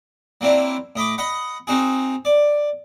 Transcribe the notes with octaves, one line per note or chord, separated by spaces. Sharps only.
F#3 A#3 C4 D4 E4
A2 D#5 B5 D6
D#5 F#5 B5
C4 D#4 F#4 G#4
D5